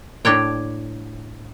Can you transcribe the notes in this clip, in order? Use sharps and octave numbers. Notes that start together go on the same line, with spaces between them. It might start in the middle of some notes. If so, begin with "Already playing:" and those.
A2 D4 C#5 G5